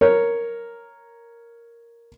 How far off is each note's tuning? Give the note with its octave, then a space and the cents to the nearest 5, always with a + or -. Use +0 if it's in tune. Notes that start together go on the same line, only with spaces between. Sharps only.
A#4 +0 C#5 +0